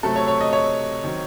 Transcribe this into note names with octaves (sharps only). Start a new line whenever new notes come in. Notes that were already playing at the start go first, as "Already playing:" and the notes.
C3 F#3 A3 C4 A4
C#5
C#5
D#5
C#5
D#3 F#3 C4